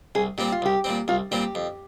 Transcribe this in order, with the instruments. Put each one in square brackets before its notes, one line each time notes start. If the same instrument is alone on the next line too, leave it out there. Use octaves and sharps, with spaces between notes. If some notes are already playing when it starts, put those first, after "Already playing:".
[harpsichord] C2 [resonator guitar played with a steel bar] G#4
[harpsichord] A#2 G3 C4 [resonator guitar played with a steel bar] G4
[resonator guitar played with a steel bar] F4
[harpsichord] C2 [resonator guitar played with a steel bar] G4
[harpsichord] A#2 G3 C4
[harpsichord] C2 [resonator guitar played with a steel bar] F4
[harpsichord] A#2 G3 C4 [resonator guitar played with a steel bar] G4
[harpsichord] F2